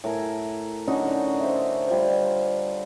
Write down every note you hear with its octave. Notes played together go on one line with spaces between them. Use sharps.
A2 A#4 G#5
D3 C#4 D#4 F#4
C5 E5
G3 F4 C5